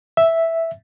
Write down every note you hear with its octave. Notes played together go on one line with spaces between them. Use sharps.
E5